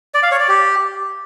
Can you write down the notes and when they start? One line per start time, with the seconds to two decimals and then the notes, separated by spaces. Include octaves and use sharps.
0.14 D5
0.23 F5
0.31 C#5
0.40 D5
0.48 G4